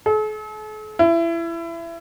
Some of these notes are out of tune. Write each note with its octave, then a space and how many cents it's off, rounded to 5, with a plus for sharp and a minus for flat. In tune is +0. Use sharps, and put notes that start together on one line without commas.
A4 -45
E4 +25